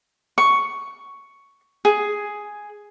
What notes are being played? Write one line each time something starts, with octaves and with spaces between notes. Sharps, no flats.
C#6
G#4